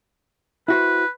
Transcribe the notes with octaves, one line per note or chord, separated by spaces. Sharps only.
E4 F#4 B4 C5